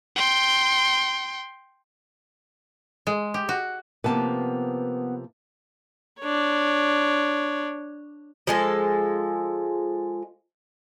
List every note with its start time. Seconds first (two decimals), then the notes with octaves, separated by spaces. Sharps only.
0.15 G5 C6
3.07 G#3
3.34 G4
3.49 F#4
4.04 C3 F3 A#3 B3 B4 A5
6.20 D4 C#5
8.47 F3 G#3 A4